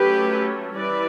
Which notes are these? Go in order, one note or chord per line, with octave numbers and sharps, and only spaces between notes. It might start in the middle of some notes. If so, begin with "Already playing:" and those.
Already playing: F#3 A3 C#4 G4 B4
E3 G3 B4 D5